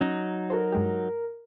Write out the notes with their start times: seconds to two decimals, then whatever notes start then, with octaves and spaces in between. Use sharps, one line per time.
0.01 F#3 C#4 D#4
0.50 F#4 A4 A#4 C5
0.72 G2 G#3 G4